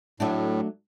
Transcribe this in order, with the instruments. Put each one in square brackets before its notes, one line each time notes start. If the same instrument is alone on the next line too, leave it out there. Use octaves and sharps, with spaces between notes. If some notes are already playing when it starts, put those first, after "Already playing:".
[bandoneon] A2 [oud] F#3 A3 D4